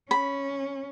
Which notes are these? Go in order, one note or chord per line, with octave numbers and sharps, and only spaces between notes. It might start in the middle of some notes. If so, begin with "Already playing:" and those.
C#4 B5